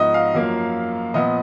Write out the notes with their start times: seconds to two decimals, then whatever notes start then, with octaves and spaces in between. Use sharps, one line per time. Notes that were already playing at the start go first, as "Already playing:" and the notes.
Already playing: G#2 F3 B3 D#5
0.14 F5
0.34 F#2 F3 A#3
1.14 A#2 F3 B3 D#5